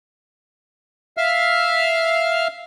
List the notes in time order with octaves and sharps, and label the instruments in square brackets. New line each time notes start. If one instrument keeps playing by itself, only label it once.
[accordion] E5 F5 F6